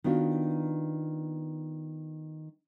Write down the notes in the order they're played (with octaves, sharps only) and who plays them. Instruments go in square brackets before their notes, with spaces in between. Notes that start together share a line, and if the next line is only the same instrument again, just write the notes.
[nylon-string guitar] D#3 B3 D4 F4 F#4